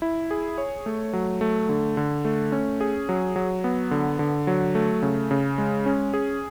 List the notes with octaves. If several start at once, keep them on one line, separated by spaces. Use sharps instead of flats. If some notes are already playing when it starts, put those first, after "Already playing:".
E4
G#4
C#5
A3
F#3
A3
D3
D3
A3
C#4
G#4
F#3
F#3
B3
D3
D3
F#3
A3
C#3
C#3
G#3
C#4
G#4